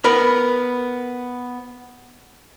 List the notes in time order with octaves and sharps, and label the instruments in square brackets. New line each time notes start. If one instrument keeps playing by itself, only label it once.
[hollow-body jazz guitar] B3 A#4 B5